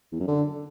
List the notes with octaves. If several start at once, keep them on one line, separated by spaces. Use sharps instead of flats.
E2
F#2
D3